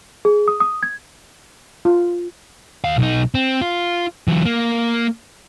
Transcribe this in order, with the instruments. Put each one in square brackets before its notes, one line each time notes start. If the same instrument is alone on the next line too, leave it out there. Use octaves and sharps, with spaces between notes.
[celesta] G#4
D#6
D#6
G#6
[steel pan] F4
[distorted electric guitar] D#2 F5
B1 D#4
C4
F4
E3 F#3
A#3